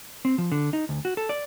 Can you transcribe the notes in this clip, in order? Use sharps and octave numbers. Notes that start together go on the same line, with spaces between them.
C4
F3
D3
D#4
D2
F#4
A4
D5